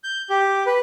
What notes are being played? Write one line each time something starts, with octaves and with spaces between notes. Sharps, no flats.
G6
G4
B4